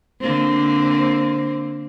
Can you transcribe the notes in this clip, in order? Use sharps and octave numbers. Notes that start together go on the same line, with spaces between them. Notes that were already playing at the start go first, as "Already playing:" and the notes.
D3 A#3 C4